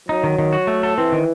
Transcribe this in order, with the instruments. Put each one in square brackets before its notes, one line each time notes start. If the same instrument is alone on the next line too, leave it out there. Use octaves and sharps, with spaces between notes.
[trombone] F#3 [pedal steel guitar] D#4
[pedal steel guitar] D#3
D#3
F#4
A3
A4
[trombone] E3 [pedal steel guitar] C4
[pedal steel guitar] D#3